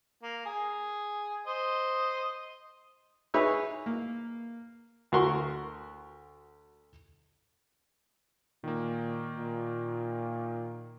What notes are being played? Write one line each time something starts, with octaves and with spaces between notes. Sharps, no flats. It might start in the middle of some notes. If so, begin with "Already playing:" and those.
A#3
G#4
C5 D#5
D#4 G#4 B4 C#5 E5
A#3
D2 F#4 A#4 C6 C#6
A#2 D#3 A#3
A#2